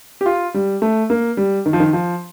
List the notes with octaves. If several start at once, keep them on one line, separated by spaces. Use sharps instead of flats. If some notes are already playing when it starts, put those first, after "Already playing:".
G4
F4
G3
A3
A#3
G3
D#3
F3
D#3
F3